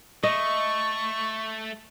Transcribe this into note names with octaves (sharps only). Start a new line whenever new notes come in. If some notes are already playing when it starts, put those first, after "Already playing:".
A3 D#5 C#6